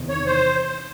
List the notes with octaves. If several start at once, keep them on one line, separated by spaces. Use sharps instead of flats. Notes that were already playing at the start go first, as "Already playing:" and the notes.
Already playing: E2 C3 D#3
C#5
C5